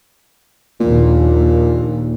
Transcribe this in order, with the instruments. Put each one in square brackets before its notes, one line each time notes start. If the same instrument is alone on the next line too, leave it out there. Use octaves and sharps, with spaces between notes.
[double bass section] A#1 D#2 [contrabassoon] A#2